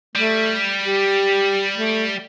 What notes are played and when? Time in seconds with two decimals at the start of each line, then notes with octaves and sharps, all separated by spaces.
0.16 G3 A3
0.84 G4
1.75 A3